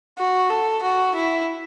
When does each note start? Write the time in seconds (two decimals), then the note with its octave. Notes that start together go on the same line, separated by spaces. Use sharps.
0.18 F#4
0.50 A4
0.82 F#4
1.14 E4